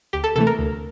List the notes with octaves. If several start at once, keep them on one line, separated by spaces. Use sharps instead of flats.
D2 G4
A4
C3 E3 A3 A4
A#4
D2